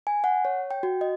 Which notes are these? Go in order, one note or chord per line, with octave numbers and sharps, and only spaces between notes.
G#5
F#5
C#5
G5
F#4
D#5